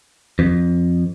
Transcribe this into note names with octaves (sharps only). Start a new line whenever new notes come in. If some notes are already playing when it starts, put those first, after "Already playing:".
F2